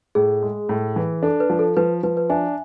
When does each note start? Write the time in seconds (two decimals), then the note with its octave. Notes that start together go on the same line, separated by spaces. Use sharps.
0.15 A2 G#4
0.42 G#3
0.69 A2
0.96 E3
1.23 D4 A4
1.40 B4
1.50 F3
1.59 A4
1.77 F3 B4
2.03 F3 B4
2.17 B4
2.30 D4 E5 G#5